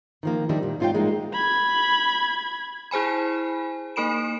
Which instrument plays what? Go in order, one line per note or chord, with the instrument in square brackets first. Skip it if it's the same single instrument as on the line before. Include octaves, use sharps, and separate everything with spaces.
[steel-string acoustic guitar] D#3 F3 A#3
D#3 G3 D4 E4
A#2
G#2 C4 F4 C#5 F5 G5
G#2 G#3 A#3 D#4 E4
[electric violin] B5 G#6
[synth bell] E4 G#4 C5 G#5 B5
A#3 D#4 A#4 B5 D7 E7